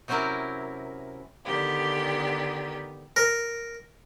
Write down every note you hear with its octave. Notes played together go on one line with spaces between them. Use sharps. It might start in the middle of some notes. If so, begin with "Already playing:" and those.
C3 F#3 C4 C#4 E4 A#4
D3 D#3 B3 G4
A#4